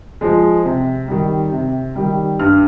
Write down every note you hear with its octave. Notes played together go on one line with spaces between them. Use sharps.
F3 G#3
C3
D#3 G3
C3
D#3 G3
G2 F6